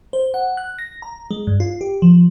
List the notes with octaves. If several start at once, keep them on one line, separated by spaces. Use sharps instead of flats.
C5
F#5
F#6
A#6
A#5
G#3
G2
F4
G4
F3